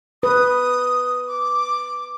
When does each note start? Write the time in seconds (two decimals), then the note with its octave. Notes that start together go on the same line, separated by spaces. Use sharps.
0.23 B4 D#6
1.28 D6